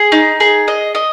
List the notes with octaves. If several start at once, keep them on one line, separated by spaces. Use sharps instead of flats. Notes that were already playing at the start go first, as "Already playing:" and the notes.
Already playing: G#4
D#4
G#4
D#5
D#5